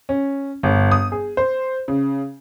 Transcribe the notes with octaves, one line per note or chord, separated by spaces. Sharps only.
C#4
G1
D#6
G#4
C5
C#3